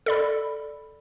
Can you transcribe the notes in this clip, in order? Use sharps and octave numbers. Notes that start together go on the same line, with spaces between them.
A4 D5 B5